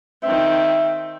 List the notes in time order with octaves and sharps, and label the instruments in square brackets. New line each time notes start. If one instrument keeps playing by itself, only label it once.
[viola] D#3 C4 [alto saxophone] E5